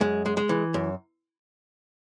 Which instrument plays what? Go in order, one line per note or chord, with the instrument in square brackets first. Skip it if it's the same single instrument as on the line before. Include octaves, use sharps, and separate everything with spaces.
[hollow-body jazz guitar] F#2 G#3
G#3
G#3
E3
F#2